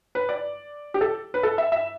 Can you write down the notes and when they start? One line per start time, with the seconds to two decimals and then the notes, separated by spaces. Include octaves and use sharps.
0.15 B4
0.29 D5
0.94 G4
1.01 A4
1.34 B4
1.43 A4
1.58 E5
1.72 E5